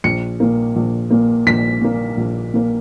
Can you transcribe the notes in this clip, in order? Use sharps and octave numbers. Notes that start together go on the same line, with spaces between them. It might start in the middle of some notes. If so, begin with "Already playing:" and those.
A#1 C#7
A#2 A#3
A#1
A#2 A#3
A#1 B6
A#2 A#3
A#1
A#2 A#3